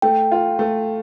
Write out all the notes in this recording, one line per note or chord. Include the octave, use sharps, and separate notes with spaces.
A3 G5
F4
A3